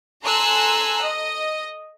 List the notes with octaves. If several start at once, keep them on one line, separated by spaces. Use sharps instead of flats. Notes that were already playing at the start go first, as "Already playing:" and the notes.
A4 G#5 A#5 C6 E6 F#6
D#5